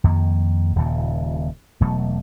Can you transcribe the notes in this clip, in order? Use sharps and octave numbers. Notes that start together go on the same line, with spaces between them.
F2 D#3 A#3
D#1 D#2 A#2 C#3
E1 B2 F#3 A3